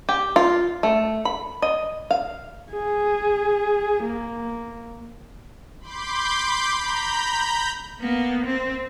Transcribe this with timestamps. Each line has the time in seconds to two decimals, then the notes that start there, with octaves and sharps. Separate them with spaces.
0.09 G4
0.36 F4
0.83 A3
1.25 B5
1.62 D#5
2.11 F5
2.72 G#4
4.04 A#3
5.80 B5 C6 D6 G6
6.75 A#5 B5 G6
8.00 A#3 B3
8.46 C4